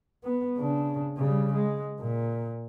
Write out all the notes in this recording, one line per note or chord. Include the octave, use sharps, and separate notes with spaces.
B3
C#3 D4
C#3 G3
G#3
A#2